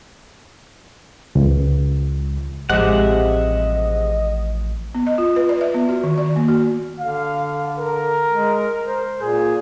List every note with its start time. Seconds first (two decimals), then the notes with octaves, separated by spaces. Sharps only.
1.35 C#2
2.70 A1 A2 C3 F3 G#3 D#5 E5 F#5
4.95 B3
5.07 D#5
5.18 F4
5.36 B4
5.49 D5
5.61 E5
5.74 B3
5.89 F#4
6.04 D#3
6.18 D5
6.36 A#3
6.48 F#4
6.99 D3 F5
7.79 A#4
8.30 G#3
8.85 C5
9.22 A#2 G#4